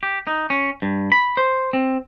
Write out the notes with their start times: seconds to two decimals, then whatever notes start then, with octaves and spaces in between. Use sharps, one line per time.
0.03 G4
0.27 D#4
0.50 C#4
0.82 G2
1.12 B5
1.37 C5
1.73 C4